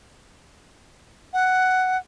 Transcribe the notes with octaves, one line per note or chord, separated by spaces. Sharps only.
F#5